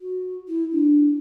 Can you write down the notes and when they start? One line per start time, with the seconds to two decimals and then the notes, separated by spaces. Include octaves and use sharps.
0.01 F#4
0.48 E4
0.71 D4